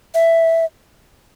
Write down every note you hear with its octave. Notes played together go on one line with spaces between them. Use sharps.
E5